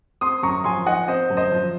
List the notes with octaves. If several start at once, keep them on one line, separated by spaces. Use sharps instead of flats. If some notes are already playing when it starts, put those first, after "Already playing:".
C4 C6 D#6
F#2 A#5 C#6
F3 G#5 C6
D#4 D#5 F#5
C4 C5 D#5
F#2
C5 D#5
F3